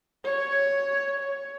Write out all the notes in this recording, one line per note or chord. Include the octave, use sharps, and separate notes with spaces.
C#5
C#5